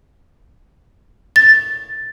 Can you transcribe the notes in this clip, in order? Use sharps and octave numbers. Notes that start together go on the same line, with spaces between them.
A6